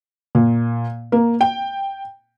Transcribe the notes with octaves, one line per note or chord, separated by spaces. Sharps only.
A#2
A#3
G5